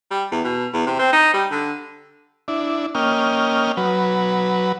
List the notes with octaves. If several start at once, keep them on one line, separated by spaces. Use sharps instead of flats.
G3
E2
B2
E2
C3
C4
D#4
G3
D3
D4 E4
A#3 C#4 D#5 G5 F6
F#3 B4